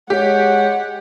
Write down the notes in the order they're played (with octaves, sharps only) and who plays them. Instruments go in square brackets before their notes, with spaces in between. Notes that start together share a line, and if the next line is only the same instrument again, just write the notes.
[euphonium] G#3 [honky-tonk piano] G4 [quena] C#5 [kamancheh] F#5